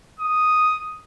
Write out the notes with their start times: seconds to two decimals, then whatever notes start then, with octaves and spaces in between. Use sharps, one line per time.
0.20 D#6